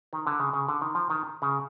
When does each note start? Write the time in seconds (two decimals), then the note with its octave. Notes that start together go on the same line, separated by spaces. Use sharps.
0.13 D#3
0.27 D3
0.40 C#3
0.53 C#3
0.68 D3
0.82 D#3
0.95 F3
1.10 D#3
1.42 C#3